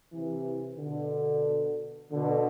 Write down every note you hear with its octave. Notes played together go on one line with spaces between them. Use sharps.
C3 E3
B2 D3
B2 D3